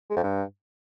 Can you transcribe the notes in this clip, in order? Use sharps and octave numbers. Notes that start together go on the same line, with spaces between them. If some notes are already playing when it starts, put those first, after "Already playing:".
G#3
F2
G2